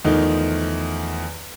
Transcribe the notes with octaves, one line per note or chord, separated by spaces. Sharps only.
E2 D#3 F3 A3 D#4